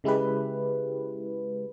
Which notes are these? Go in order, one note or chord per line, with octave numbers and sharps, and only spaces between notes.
C#3 G#3 E4 G4 B4